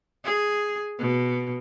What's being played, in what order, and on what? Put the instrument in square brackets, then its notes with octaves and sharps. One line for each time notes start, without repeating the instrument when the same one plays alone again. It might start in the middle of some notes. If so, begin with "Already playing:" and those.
[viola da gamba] G#4
B2